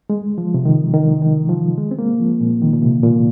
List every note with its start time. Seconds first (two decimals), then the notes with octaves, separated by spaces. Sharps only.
0.10 G#3
0.38 F3
0.54 C3
0.65 D#3
0.94 D#3
1.22 D#3
1.49 F3
1.78 G#3
1.91 C4
1.99 A#3
2.19 F3
2.41 A#2
2.62 D#3
2.73 A#2
2.83 C3
3.04 A#2